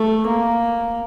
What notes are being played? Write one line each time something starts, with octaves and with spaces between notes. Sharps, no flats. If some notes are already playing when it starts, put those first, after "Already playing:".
Already playing: A3
A#3